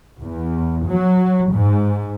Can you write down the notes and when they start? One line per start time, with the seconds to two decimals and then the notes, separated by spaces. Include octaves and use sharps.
0.21 E2
0.86 F#3
1.52 G#2